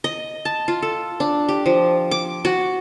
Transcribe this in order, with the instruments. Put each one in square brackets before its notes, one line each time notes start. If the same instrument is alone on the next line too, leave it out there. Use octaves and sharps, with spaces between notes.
[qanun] D#5
A5
F4
A4
D4
G4
F3
D6
F#4